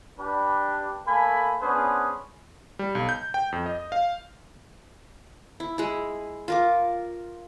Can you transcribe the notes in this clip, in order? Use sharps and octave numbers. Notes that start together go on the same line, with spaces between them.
D4 G4 B4
A3 A#3 A4 G#5 B5
B3 C#4 D4 G#4 B4 C5
G3
B1
G6
G5
F2
D#5
F5
E4
G#3 E4
F4 A#4 D6